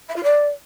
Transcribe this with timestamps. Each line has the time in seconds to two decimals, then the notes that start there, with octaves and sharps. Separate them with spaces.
0.08 E5
0.16 F4
0.23 D5